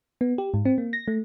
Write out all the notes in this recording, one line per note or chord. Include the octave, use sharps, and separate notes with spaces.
B3
G4
G#2
C4
A#3
A#6
A3